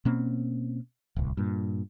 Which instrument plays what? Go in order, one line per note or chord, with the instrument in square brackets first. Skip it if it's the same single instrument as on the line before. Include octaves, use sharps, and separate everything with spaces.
[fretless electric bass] B2 A#3 C4 C#4
D1 C2
G2 A#2